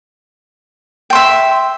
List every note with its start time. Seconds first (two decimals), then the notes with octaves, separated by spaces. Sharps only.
1.10 G5
1.13 C6
1.15 E5